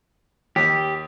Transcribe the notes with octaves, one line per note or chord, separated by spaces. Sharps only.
D#2 G4